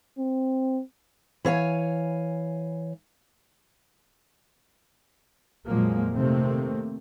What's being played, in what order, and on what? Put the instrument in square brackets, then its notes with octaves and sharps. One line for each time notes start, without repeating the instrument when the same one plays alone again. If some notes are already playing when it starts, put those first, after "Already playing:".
[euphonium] C4
[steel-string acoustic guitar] E3 C#5 F5 G#5
[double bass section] F2 A#2 F3 F#3 G#3 A#3
C3 D#3 A3 A#3 C4